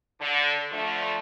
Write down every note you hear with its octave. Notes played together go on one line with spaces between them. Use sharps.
D3
D3 F3 A3